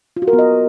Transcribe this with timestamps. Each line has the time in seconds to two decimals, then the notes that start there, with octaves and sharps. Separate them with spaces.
0.17 F4
0.22 F#4
0.28 A#4
0.33 B3
0.39 D#5